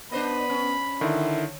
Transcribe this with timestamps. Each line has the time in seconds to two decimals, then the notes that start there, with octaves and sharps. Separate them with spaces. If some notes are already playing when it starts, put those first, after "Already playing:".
0.12 B3 D4 C5 D#5 B5
0.49 C#4
1.01 D3 D#3 E4